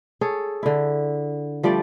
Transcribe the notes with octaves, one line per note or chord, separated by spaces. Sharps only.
G#4 A4 C#5
D3 E4
F3 G3 A3 D5